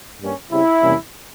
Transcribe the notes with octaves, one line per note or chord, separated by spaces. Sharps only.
G2 G3 A#3 C#4
C#3 G3 C4 E4
E2 C3 G3 A#3 C#4